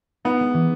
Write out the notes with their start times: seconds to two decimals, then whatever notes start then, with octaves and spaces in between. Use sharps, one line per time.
0.25 B3 D#4
0.40 G#3
0.54 E3